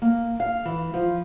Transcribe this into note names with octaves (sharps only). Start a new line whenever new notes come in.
A#3
F5
E3
F3